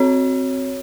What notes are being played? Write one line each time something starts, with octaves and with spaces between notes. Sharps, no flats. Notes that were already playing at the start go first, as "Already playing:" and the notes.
Already playing: C4 F#4 C#5